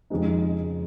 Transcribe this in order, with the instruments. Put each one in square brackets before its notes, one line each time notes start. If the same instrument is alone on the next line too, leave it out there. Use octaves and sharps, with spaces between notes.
[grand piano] F2 C#3 F3 G#3 D#4